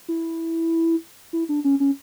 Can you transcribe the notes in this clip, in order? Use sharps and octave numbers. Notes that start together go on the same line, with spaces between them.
E4
E4
D4
C#4
C#4